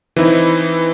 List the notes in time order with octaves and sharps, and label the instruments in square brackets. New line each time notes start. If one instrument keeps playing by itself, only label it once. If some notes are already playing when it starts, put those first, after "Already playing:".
[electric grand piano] E3 C4 D#4 E4